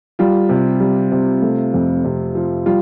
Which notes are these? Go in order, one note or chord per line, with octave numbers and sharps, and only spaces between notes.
G3 F4
C3
G3
C3
A3
F2
C3
F3
G3 F4